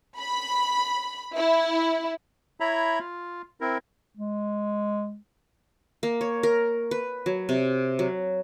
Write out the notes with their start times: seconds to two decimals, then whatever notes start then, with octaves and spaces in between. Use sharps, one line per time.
0.18 B5
1.35 E4
2.60 E4 C#5 E5 A#5 B5
2.99 F4
3.61 C4 E4 A#4
4.17 G#3
6.03 A#3
6.21 C#5
6.43 A#4
6.91 B4
7.26 F#3
7.49 C3
7.99 F#3